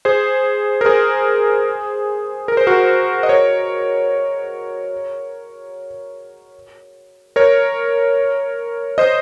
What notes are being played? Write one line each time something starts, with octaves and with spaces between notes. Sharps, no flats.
G#4 C5
A#4
G#4 C5
A#4
C5
F#4 A#4
D#5
A#4 C#5
A#4 C#5
C5 D#5